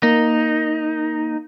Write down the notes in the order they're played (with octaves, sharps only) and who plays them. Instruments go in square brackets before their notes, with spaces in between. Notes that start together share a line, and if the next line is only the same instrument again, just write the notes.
[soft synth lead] A#3 [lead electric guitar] D#4